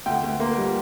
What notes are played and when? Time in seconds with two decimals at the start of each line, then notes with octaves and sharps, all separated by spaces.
0.06 D2 G5
0.24 D2
0.40 A#3 C6
0.57 G3